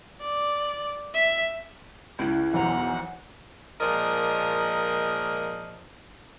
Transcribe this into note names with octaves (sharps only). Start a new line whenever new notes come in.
D5
E5
C#2 E4
B1 E2 E3 C5 F#5 A#5
A#2 F3 G#3 A#4 D5 D#5